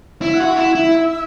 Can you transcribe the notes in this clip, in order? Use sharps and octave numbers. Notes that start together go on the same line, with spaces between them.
E4 E5
F#5
F#4
E5
E4
E4